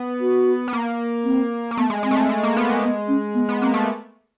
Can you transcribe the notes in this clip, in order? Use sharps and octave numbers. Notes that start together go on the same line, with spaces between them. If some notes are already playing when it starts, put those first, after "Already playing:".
Already playing: B3
F#4
B3
A#3
C4
A#3
A3 B3
G#3
G#3 C4
A3
G#3
G#3
A#3
B3
G#3
B3
C#4
B3
B3
A#3 C4
A3